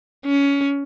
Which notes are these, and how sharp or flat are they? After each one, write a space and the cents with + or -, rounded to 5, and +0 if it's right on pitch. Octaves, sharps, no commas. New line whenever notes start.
C#4 +20